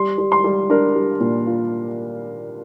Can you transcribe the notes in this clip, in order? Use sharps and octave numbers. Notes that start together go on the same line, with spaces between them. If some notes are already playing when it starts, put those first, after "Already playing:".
Already playing: G3 C6
G3
C6
G3
D4 A#4
G3
A#2
F4